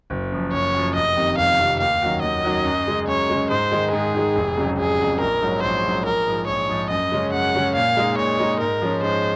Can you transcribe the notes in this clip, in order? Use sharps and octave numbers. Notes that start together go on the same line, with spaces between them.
F#1
F#2 F3
F#1 C#5
F#2 F3
F1 D#5
F2 C3 D#3
F1 F5
F2 C3 D#3
D#2 F5
D#3 F#3 C#4 F#4
D#2 D#5
D#3 F#3 C#4 F#4
F#2
C#3 G#3
F#2 C#5
C#3 G#3
G#2 C5
D#3 G#3
G#2 G#4
D#3 G#3
F1
F2 C#3 F#3
F1 G#4
F2 C#3 F#3
A#1 A#4
G#2 F#3 C#4
A#1 C5
G#2 F#3 C#4
A#1 A#4
G#2 F3
A#1 C#5
G#2 F3
F#2 D#5
C#3 G#3 C#4
F#2 F#5
C#3 G#3 C#4
A#2 F5
G#3 D#4
A#2 C#5
G#3 D#4
G#2 A#4
F3 G#3 C#4
G#2 C5